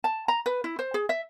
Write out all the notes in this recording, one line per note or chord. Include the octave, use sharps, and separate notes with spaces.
A5
A#5
B4
E4
C5
G#4
E5